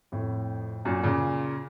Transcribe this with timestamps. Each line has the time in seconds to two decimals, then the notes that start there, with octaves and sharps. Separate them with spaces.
0.12 F2 A2
0.85 F#2 A#2
1.03 A#2 C#3